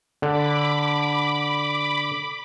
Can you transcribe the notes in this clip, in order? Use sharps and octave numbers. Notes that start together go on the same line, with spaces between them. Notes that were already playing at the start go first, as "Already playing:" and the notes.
D3 B5 D6